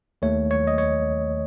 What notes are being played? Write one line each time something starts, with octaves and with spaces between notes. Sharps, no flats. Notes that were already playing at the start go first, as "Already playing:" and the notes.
D#2 D#3 A3 C#5
C#5
D#5
C#5